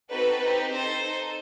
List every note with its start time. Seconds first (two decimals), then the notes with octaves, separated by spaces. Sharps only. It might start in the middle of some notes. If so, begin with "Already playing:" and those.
0.11 C4 D#4 F#4 A4 B4
0.41 C4 D#4 G4
0.71 D#4 A4 C5
1.01 D#4 A4